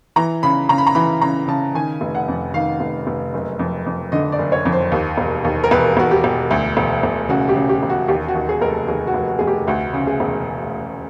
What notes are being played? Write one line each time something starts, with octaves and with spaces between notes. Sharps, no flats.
E3 A#5
C#3 B5
C#3 A#5
B5
A#5
E3 B5
C#3 A#5
C#3 A5
D#3 G#5
F1
F#5
F2
D#3 F5
F1
F1
F#1
F2
F2
D3 D#5
D5
F#1
C#5
F2
C5
D#2
E1
D#2
A#4
E1 B4
E1 F#4
G4
E1
D2
E1
E1
C#3 F#4
G4
C#3
G4
E1
F#4
D#2 G4
F#4
D#2
G#4
F1 A#4
A4
D#2 G#4
F#4
F1
F#4
F1 G#4
G4
D2 F#4
C#3
G#4
E1